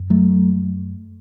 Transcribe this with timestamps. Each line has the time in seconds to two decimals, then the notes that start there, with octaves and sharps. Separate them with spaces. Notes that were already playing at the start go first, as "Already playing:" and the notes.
Already playing: F#2
0.10 F#3 A3